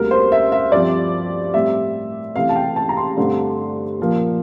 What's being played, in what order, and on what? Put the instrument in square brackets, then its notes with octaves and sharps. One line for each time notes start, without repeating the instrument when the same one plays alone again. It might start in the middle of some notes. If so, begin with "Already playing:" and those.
Already playing: [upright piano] D2 C3 G3 A#3 A#4
C5
E5
E5
G2 F3 C4 D5
A2 G3 C4 E5
C2 C3 E3 A3 F5
A5
G5
A5
A#5
C6
G2 D3 A3 C4
A#2 F3 A#3